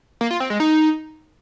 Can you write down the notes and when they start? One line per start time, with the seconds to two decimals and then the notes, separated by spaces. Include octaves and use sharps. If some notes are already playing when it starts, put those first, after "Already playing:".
0.21 A#3
0.31 F4
0.40 C4
0.50 G#3
0.60 D#4